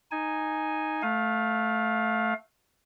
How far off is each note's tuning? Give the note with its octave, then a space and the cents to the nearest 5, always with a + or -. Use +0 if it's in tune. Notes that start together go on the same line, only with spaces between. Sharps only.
D#4 +0 G#5 +0
A3 -10 F5 +20